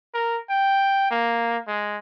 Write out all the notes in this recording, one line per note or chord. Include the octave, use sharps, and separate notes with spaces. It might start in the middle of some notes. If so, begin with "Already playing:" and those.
A#4
G5
A#3
G#3